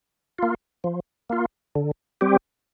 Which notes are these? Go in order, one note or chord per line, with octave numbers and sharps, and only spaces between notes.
A#3 F4
F3
A#3 F4
D3
G3 C4 G4